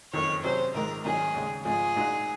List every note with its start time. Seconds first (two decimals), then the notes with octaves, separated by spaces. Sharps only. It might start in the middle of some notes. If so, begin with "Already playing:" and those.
0.13 F#1 F2 D#3 C#5
0.44 C3 F#3 C#4 G#4 C5
0.74 A#1 G#2 D#3 G#3 A#4
1.05 G#1 G#2 D#3 F#3 G#4
1.34 D#2 C#3 G#3
1.65 G#1 G#2 F3 G#4
1.96 A#2 G#3 D#4 F#4